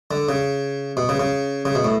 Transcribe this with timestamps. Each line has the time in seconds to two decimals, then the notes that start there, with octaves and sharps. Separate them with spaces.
0.11 D3
0.29 C#3
0.97 B2
1.09 C#3
1.19 C#3
1.65 C#3
1.75 B2
1.84 A2